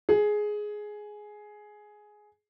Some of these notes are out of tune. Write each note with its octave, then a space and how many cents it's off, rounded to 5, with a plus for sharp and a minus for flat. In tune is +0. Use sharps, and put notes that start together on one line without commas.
G#4 +10